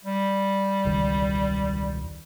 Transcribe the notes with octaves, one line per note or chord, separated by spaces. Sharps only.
G3
E1 C#2 D#3